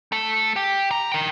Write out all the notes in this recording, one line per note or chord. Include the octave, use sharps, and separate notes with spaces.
A3 A4
G4
A#5
A#4 G5